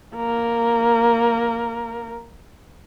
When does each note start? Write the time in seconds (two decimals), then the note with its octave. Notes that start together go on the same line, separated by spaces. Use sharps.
0.16 A#3 A#4